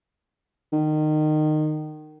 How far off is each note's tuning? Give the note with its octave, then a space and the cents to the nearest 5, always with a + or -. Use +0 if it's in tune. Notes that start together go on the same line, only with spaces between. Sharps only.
D#3 -25